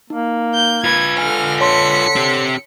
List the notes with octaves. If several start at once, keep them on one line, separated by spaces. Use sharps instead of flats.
A#3 D#4
G6
F4 B4 G#6
D3 G#5 F6
C#5 A5 C6 B6 C#7
C4 G4